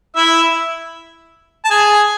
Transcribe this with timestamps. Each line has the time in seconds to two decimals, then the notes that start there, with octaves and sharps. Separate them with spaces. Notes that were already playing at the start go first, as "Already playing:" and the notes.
0.16 E4 E5
1.65 A5
1.71 G#4 G#5